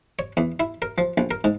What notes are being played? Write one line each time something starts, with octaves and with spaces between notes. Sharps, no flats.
C#5
E2
E4
A#4
F3
A#1
A#4
G#2